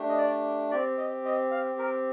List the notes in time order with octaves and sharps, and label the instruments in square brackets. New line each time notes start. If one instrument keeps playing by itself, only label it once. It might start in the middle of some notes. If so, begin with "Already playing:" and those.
Already playing: [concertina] A3 D4 G4
D#5
D5
C4 G4 D5
D#5
D#5
F5
A#4